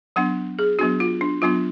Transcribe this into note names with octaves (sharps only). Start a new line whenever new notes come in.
F#3 B3 D4 F#5
G#4
F#3 B3 D4 F#4
F4
D4
F#3 B3 D4 F4